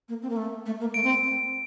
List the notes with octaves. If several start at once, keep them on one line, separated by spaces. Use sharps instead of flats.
A#3
C4
A#3
A3
A3
A#3
A3 D7
C4